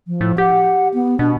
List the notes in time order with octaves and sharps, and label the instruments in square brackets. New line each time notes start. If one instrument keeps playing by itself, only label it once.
[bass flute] F3
[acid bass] A2
[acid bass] G4 [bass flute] F#5
[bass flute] B3
[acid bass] B2 [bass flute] D4